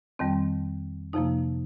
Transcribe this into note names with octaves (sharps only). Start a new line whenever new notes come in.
F2 D#3 G3 C4
F2 C3 F3 A#3 D#4